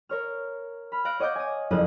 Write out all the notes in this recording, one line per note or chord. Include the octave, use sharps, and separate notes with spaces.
A#4 C#5 F6
B5 F6
F5 F#6 A#6 C#7 D7
C#5 D#5 F#5 D6 G6 A#6
G#5 D#6
F#1 F2 C#3 D#6 F#6